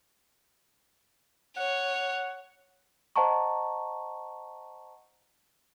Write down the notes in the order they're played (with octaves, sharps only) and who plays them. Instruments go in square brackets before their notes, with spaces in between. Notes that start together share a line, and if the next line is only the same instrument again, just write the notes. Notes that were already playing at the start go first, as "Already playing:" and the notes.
[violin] C#5 [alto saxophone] F#5
[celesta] C5 D#5 F#5 A5 A#5 C#6